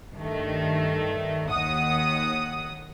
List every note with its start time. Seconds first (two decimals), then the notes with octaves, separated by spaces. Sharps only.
0.14 G2 D#3 A3
1.50 D#2 D#3 F#5 D#6